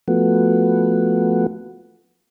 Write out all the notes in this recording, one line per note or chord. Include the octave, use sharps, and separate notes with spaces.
F3 A3 B3 F#4